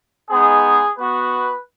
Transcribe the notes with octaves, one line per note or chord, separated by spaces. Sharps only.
G#3 B3 D#4 G#4
B3 F#4 B4